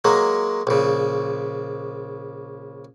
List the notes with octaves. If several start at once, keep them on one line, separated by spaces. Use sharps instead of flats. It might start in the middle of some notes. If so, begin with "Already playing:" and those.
F#3 G#3 A#3
A#1 C#3